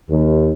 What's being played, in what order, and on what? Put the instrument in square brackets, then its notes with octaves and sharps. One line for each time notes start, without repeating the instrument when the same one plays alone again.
[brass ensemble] D#2